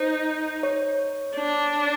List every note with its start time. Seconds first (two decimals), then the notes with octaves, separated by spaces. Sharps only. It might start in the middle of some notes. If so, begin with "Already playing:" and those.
Already playing: D#4 C5
0.63 C#5
1.35 D4